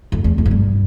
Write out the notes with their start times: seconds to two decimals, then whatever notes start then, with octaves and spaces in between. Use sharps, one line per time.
0.12 F2
0.24 E2
0.38 F2
0.46 G#2
0.51 G2